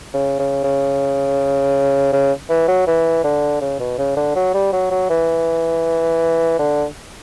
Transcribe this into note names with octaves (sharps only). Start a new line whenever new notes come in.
C#3
C#3
C#3
C#3
E3
F#3
E3
D3
C#3
B2
C#3
D3
F#3
G3
F#3
F#3
E3
D3